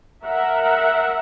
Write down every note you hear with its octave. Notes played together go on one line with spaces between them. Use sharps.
A#4 E5 F#5